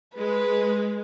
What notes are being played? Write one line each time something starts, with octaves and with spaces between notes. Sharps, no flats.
G#3 B4